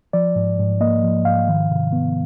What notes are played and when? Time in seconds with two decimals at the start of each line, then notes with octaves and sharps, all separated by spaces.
0.13 F3 D5
0.36 G#2
0.59 G#2
0.81 A#3 D#5
1.03 F3
1.25 G#2 F5
1.48 D#3
1.69 C3
1.93 B3